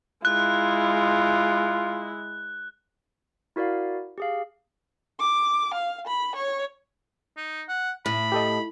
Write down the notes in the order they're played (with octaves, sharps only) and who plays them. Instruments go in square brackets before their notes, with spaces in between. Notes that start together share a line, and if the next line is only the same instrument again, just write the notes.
[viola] G#3 E4 [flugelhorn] F4 [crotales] F#6
[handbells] E4 F#4 A#4 D5 F5
G4 G#4 F5
[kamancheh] D6
F5
B5
C#5
[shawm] D#4
F#5
[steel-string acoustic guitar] A2 [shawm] B5
[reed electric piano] G4 A4 D#5